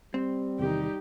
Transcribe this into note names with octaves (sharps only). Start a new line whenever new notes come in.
G3 C4
E2 C3 D#3 D#4 G4